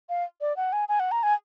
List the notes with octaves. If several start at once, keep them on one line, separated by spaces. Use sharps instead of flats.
F5
D5
F#5
G#5
G#5
F#5
A#5
G#5